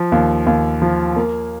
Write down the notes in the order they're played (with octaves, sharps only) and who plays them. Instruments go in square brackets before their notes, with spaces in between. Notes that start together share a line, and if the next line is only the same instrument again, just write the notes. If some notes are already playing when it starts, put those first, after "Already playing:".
Already playing: [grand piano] F3
D#2
D#2
F3
A#3